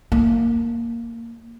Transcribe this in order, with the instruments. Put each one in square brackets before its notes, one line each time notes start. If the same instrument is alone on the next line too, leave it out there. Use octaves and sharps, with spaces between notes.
[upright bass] A#3